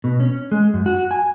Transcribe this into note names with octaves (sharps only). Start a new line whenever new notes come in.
B2
C#4
G#3
F#2
F#4
G#5